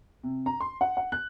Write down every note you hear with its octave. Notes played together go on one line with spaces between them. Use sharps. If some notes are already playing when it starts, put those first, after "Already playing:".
C3
A#5
C6
F#5
F#5
F#6